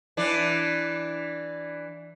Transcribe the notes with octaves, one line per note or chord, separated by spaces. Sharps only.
E3 D4